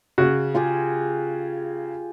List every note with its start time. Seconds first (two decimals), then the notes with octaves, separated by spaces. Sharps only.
0.18 C#3 F#4
0.55 F4 G4 G#4